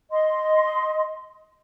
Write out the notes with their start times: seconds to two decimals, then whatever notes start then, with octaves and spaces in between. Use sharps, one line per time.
0.11 D#5 C6